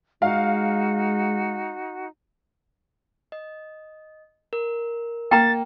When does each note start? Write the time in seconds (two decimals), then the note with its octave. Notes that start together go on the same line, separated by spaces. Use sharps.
0.22 G#3 D#4 F#4 F5
3.32 D#5
4.53 A#4
5.31 A#3 G5 A#5 A6